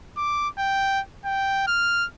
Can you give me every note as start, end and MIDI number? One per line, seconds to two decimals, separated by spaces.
0.17 0.48 86
0.58 1.00 79
1.25 1.64 79
1.67 2.07 89